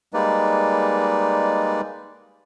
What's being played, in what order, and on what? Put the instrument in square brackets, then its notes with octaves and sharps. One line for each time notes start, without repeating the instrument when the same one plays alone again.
[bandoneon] G3 G#3 A#3 D#4 B4 D5